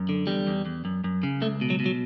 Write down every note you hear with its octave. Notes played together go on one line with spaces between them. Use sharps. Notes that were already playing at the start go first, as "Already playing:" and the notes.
Already playing: F#2
D3
E2 G3
E2
E2
F#2
F#2
C#3
C#2 A3
B2
F#3
B2
F#3